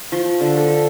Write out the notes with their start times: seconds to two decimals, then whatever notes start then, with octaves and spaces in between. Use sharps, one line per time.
0.12 F3
0.41 D3
0.57 A4